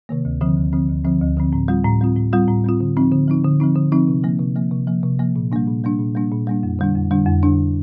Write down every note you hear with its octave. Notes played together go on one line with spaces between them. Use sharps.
C3 D#3 A#3
D2
D3 F3 C4
D2
D3 F3 C4
D2
D3 F3 C4
D2
D3 F3 C4
A2
G3 C4 F4
A2
G3 C4 F4
A2
G3 C4 F4
A2
G3 C4 F4
D3
F3 C4 D#4
D3
F3 C4 D#4
D3
F3 C4 D#4
D3
F3 C4 D#4
C3
F3 A#3
C3
F3 A#3
C3
F3 A#3
C3
F3 A#3
A#2
G3 A#3 D4
A#2
G3 A#3 D4
A#2
G3 A#3 D4
A#2
G3 A#3 D4
F2
D3 G3 D4
F2
D3 G3 D4
F2
D3 G3 D4